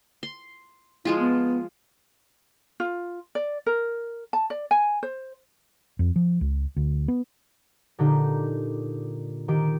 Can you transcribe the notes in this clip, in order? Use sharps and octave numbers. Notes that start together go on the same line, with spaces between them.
C6
F3 G#3 E4 F4
B3
F4
D5
A#4
A5
D5
G#5
C5
F2
F3
C#2
D2
B3
A#2 D3 D#4 G4
D#3 G4 D7